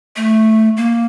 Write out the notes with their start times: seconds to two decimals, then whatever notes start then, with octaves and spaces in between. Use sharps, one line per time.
0.16 A3
0.77 A#3